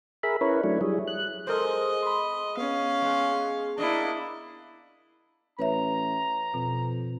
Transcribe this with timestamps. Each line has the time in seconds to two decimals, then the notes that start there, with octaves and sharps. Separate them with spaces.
0.23 G#4 A#4 E5 B5
0.41 C#4 E4 A#4 B4 C#5
0.64 F#3 A3 D4 E4 C#5
0.81 F#3 G3 E4 G#4
1.07 F#6
1.47 G#3 A4 A#4 C5 D#5
2.02 B5 C6
2.57 B3 C#4 F5
3.02 G#3
3.78 A#3 D4 E4 D#5
5.59 A1 B4 C#5 E5 A#5
6.54 F2 B2